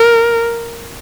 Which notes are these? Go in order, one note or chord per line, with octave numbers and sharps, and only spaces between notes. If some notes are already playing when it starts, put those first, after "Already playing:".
Already playing: A#4